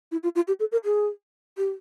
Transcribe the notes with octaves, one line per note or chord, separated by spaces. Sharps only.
E4
F4
F4
G4
A4
A#4
G#4
G4